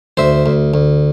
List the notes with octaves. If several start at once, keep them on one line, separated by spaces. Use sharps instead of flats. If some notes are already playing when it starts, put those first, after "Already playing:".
D2 C5 E5
D2
D2